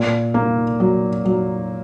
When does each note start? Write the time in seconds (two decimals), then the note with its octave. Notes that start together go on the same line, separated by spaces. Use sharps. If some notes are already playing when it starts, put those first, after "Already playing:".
Already playing: A#2
0.34 A#3
0.80 F#3
1.25 F#3